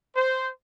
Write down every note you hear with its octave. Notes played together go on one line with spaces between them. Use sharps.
C5